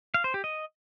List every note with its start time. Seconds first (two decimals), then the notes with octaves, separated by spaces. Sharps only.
0.14 F5
0.24 C5
0.34 G4
0.44 D#5